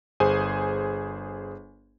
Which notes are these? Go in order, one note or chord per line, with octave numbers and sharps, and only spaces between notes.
G1 G#4 C5 G#5